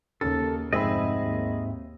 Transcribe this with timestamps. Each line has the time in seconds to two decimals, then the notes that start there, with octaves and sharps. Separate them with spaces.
0.21 D#2 C#3 A4
0.73 F1 G#2 C4 G#4 D#5 E5 B5
1.24 D#2